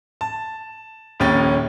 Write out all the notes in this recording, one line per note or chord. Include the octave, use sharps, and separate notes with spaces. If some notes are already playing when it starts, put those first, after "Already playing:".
A5
D#1 A#1 D#2 C#4 G5 A6